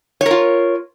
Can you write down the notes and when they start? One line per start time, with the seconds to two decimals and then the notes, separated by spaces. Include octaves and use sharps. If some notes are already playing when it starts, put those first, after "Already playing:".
0.21 C#5
0.26 A#4
0.31 F4